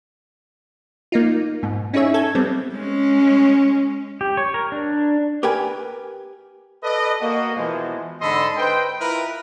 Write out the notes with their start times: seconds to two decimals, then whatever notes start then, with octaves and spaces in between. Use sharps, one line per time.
1.12 A#3 D#4 F4
1.63 G#2 B2
1.94 C#4 D#4 E4 G#4 C#5 E5
2.14 A4 G#6
2.35 G3 B3 C4
2.75 G#3 C#4
4.21 G4
4.37 C#5
4.54 A#4
4.72 D4
5.43 G4 A#4 B4 G5 G#5
6.83 A4 B4 D5 D#5
7.21 A#3 F#4 D#5
7.55 B2 E3 F3 G#3
8.21 G#2 D3 A4 D#5 B5 C6
8.57 B4 C5 D#5 G5
9.00 E4 F4 A#4 B4